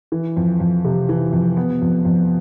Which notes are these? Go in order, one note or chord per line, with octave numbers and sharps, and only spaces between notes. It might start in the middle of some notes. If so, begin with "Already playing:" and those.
E3
F2
F2
C3
E3
F2
B3
F2
F2